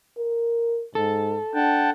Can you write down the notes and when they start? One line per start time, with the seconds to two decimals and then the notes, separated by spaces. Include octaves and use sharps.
0.17 A#4
0.95 G#2 A4
1.54 D4 F#5 G5 A5